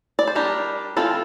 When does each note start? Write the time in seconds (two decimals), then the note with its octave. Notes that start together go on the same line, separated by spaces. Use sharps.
0.19 D5
0.27 C5
0.35 G3 D4 G4 A#4
0.97 E3 A3 C4 F4 A4